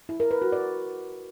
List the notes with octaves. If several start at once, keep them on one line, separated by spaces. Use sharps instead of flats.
E4
A#4
B4
F#4
D5